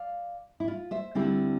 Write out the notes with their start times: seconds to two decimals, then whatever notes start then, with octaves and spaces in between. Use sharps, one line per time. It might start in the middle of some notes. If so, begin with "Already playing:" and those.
Already playing: D5 F5
0.60 E4
0.68 F4
0.91 C5 E5
1.15 D2 D3 G3 C4 E4